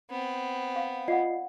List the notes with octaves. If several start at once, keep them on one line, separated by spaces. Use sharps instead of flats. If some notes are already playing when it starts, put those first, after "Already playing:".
B3 C4
F5
F4 D5 D#5 F5 F#5 C7